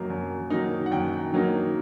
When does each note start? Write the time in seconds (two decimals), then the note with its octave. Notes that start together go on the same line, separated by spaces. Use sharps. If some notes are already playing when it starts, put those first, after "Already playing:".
Already playing: F#2 D#3 F#3 A#3 D#4
0.10 F#2
0.50 D#3 F#3 A#3 D#4
0.86 F#5
0.91 F#2 G5
1.32 D#3 F#3 A#3 D#4